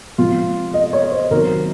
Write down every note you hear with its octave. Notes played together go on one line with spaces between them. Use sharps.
C3 F3 G#3 F4
D#5
C#5
C5
C3 D#3 F#3 A#4